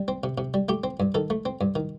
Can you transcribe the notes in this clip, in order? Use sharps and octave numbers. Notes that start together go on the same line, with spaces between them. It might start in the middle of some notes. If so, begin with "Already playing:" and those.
Already playing: G3
C4
C3
C3
G3
A3 G4
C4
G2
D#3 A4
A3
C4
G2
D#3